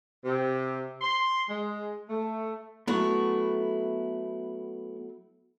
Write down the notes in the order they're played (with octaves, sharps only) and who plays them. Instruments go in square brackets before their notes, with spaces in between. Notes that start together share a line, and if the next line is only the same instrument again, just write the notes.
[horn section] C3
C6
G#3
A3
[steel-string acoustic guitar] F#3 A3 E4 [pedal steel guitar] B3 C#6